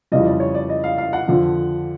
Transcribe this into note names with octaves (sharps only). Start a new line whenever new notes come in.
F2 C#3 E3 G3 D#5
D5
C#5
D5
D#5
F5
F5
F#5
F2 D3 F3